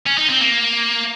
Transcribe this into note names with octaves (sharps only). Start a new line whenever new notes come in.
C#4
D#4
C4
A#3